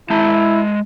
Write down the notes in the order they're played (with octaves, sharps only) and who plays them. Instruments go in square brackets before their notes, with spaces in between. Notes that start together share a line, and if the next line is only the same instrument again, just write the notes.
[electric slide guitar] G#3 A5 A#5 [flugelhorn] E4